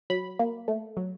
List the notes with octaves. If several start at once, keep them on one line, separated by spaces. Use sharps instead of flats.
F#3 B5
A#3
A3
F#3